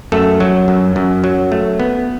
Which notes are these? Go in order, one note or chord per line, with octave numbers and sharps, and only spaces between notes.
F#2 A3 A4
F#3
F#2
F#2
F#3
A3
B3